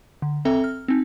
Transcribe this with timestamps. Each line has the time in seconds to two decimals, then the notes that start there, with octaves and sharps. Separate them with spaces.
0.22 D3
0.45 C4 A4 E5 G5 A#5
0.64 F6
0.88 C4 D#4